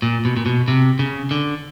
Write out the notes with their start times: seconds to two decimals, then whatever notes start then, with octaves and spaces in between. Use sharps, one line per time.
0.02 A#2
0.25 B2
0.36 A#2
0.46 B2
0.68 C3
0.99 C#3
1.31 D3